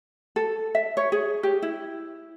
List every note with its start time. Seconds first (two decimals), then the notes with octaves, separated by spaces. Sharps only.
0.36 A4
0.75 E5
0.97 C#5
1.12 G#4
1.43 G4
1.62 E4